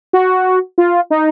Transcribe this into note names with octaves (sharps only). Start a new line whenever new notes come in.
F#4
F4
D#4